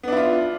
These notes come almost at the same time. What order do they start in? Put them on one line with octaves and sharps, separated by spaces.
B3 D4 E4 F4